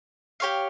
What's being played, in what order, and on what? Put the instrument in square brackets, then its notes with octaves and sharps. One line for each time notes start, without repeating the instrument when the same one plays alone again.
[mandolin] G4 C#5 F5